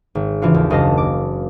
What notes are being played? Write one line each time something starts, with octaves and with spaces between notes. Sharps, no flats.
G#1
C#3 E3 D4 F4 F#4
D#2
F#1 D#5 F5 A5 A#6
D6